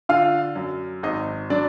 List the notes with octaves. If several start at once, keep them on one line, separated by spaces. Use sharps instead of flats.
D3 F4 F5
F#2
G#1 D#4 D#5
F#3 D4 D5